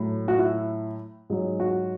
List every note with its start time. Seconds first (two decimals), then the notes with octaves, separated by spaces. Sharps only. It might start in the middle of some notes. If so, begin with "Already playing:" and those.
Already playing: A2 F#3
0.28 F#4
0.39 E4
1.30 G#2 F#3 G#4
1.60 F#4